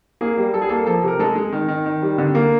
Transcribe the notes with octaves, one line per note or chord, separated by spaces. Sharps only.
A#3 G#4
G3
G3 A4
G#4
A#3 A4
F3 A4
C3 A#4
G#3 A4
G#3
D#3
D#3
D#3
G3
D3
A#3